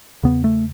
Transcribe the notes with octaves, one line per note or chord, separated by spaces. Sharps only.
E2 C#3 B3
A3